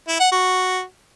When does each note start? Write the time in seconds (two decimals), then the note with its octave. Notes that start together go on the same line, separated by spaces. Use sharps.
0.08 E4
0.20 F#5
0.32 F#4